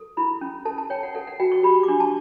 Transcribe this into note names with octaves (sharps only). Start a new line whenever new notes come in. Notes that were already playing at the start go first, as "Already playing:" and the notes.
Already playing: A4
E4 B5
C#4
A4 A5
A5
C#5 G5
F#5
A4 F#5
F#5
F#4 G5
C#6
G4 B5
D6
D4 C#6
A5